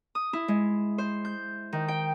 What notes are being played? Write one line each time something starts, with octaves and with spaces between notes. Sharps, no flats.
D#6
E4
G#3
C5
G6
D#3
G5